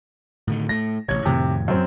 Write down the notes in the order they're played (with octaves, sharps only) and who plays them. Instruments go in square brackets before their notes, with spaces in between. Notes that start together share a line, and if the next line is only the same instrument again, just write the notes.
[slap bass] A2 D3 D#3
[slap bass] A2 A3 [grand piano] A#6
[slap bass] A1 C3 [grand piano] C#5 G#6
[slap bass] F2 A2 D#3 [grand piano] C3
[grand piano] F#2 C4